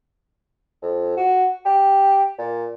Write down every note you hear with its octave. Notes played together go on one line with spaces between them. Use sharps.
F2
F#4
G4
A#2